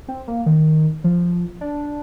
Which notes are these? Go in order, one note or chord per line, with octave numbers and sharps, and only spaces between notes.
C4
A#3
D#3
F3
D4